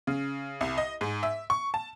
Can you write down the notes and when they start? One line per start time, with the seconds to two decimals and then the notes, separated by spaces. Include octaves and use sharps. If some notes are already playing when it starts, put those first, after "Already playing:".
0.07 C#3
0.61 C2
0.78 D#5
1.01 G#2
1.23 E5
1.50 C#6
1.74 A5